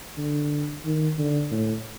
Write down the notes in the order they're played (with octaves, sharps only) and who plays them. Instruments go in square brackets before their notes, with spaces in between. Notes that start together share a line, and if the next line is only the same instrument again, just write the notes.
[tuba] D3
D#3
D3
A2